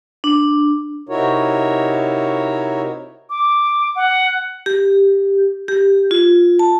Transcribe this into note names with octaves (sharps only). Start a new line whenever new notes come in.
D4
C3 D#4 E4 F#4 A#4 C#5
D6
F#5
G4
G4
F4
A5